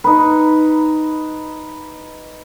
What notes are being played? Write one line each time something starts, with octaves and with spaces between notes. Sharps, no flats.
D#4 B4